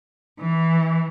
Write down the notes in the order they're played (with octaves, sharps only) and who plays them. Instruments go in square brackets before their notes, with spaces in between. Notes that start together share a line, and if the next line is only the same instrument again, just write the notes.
[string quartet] E3